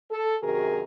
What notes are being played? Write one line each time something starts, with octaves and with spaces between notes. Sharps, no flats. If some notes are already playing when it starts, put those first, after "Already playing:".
A4
F#2 C3 D#3 F#4 G#4 A#4